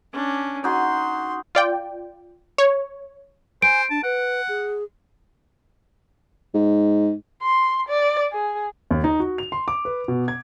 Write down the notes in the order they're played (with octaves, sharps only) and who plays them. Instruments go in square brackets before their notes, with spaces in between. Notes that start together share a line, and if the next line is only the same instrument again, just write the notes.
[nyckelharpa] C#4 D4
[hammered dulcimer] D#4 F#4 G#4 [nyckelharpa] C6
[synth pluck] F4 D5 G5
C#5
[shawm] C5 [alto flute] G#5 [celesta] D7
[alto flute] D4 [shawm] A5
[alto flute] B4 [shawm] F#5
[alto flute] G#4
[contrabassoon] G#2
[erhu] C6
D5
G#4
[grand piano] D#2
D#4
F#4
F7
C6
D6
B4
B2
G#6